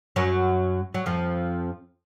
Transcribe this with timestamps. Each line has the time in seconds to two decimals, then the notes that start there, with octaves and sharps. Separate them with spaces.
0.16 F#2 F#3
0.94 F#3
1.06 F2 F3